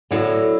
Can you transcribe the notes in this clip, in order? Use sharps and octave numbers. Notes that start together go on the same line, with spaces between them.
A2 D3 F#3 B3 E4